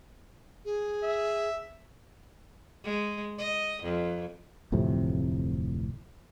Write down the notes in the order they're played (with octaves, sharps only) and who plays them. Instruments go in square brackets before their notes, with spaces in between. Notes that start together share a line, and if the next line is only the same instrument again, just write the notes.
[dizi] G#4
[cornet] E5
[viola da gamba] G#3
D#5
F2
[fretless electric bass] D1 F2 A2 C3